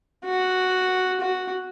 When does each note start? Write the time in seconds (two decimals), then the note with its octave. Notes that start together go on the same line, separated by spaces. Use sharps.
0.25 F#4
1.21 F#4